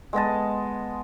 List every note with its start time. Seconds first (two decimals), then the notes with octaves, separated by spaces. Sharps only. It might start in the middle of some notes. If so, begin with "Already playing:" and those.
0.13 G#3 B3 D#5 A5